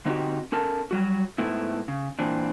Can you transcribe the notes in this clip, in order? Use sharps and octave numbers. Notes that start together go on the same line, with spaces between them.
D3 C4 D#4 E4 F#4 G4
C#4 A4 A#4 A5
F#3 G3 F#4
G#2 A3 B3 E4
C#3
A#2 E3 C4 D4